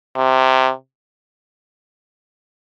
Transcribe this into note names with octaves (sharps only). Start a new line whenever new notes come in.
C3